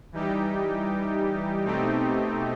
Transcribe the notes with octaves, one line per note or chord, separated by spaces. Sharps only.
E3 G3 D#4 G4
B2 A3 C4 D#4 G4